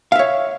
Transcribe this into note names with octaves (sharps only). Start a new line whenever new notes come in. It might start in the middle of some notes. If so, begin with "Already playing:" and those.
C#5 E5 F5